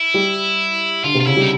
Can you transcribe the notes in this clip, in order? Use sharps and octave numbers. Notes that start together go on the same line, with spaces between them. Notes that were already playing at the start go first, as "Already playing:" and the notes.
Already playing: E4
G3
D3 F4
C3
F4
C#3 E4
G3 D#4